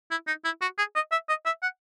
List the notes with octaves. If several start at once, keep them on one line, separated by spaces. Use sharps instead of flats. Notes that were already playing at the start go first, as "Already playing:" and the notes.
E4
D#4
E4
F#4
G#4
D#5
E5
D#5
E5
F#5